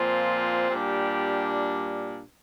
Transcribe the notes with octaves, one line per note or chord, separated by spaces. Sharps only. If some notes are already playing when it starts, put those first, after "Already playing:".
Already playing: A#2 F3 C4 F4
A#2 G3 D4 G4